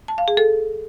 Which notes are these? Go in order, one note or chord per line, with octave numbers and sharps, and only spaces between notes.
A5
F5
G#4
A4